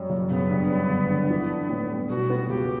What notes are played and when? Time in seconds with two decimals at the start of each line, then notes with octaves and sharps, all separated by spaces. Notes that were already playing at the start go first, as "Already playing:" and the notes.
Already playing: F#2 G3
0.10 F#1
0.30 C#3 B3
0.49 G2
0.70 G3
0.89 G1
1.10 D3
1.30 E3
1.50 D4
1.69 A2
1.90 G3
2.09 B2 F#4
2.30 B3
2.49 C#2 G4